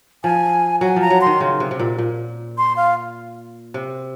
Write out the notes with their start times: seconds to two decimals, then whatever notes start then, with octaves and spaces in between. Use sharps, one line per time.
0.24 F3 G#5
0.81 F#3 G#5
0.96 F3 A#5
1.10 F#3
1.21 D#3 C6
1.41 C#3
1.60 C3
1.71 C3
1.79 A#2
1.98 A#2
2.58 C6
2.76 F5
3.74 C3